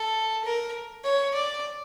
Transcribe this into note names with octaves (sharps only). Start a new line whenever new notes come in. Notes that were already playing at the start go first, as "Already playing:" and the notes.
Already playing: A4
A#4
C#5
D5